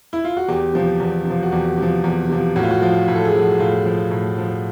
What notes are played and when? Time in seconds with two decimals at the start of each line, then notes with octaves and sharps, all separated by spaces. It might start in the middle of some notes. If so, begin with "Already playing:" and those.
0.13 E4
0.25 F4
0.37 F#4
0.48 E2 G4
0.73 C3 F3
1.00 E2
1.25 C3 F3
1.43 F#4
1.51 E2 G4
1.78 C3 F3
2.04 E2
2.29 C3 F3
2.56 A2 F#4
2.63 F4
2.71 F#4
2.82 F3 F4
3.08 A2
3.15 A4
3.25 G#4
3.34 F3
3.42 F#4
3.60 A2 F4
3.86 F3
4.11 A2
4.38 F3